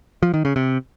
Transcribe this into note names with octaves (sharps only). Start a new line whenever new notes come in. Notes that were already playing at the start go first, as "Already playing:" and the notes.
F3
D#3
C#3
C3